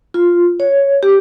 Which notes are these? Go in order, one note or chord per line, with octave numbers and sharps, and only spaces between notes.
F4
C#5
G4